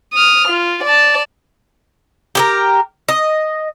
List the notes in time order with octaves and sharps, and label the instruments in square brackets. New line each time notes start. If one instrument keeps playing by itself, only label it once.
[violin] D#6 F6
F4
D5 A5
[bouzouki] G4 G#4 A#4
D#5